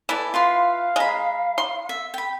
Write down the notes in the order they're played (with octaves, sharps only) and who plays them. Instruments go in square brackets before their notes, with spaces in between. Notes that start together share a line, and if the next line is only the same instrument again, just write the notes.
[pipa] E3 [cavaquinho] E4 A4 D5
[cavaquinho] F4 B4 C6 [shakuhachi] F5
[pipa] G#3 [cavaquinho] A#5 B5
[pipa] C6
[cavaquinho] E5
G5 B5